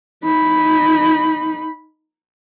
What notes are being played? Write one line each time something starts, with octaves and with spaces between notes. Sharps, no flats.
D#4 B5